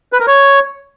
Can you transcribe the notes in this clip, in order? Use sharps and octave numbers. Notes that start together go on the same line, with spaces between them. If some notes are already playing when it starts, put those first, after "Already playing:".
B4
A#4
C#5